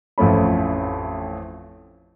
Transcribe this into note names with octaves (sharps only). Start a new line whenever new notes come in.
A1 F2 F3 A3 C#4 B5